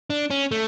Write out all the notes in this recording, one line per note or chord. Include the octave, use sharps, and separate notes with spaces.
D4
C#4
A3